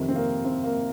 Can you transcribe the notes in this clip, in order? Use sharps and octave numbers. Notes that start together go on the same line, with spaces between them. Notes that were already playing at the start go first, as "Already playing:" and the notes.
Already playing: F2 C3 D#3
C4
A#3
C4
A#3